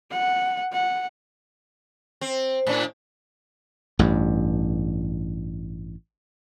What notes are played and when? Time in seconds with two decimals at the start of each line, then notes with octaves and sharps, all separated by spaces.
0.11 F#5
0.73 F#5
2.21 C4
2.67 A2 D4
3.99 A1 G2